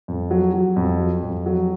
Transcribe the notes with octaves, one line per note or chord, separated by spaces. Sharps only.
F2
F#3
F#3
F2
F#3
F2
F#3